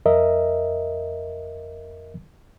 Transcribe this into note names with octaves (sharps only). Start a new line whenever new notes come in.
F2 A#4 D#5 E5